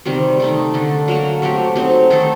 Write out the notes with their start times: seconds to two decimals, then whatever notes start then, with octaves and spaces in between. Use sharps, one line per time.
0.05 C3 D#3 G3 C4
0.40 D#3 A3 D#4
0.74 D3 A3 D4
1.08 F#3 A#3 F#4
1.42 F#3 A3 C4 G4
1.76 F#3 C4 D#4
2.10 D#3 A3 D#4 A4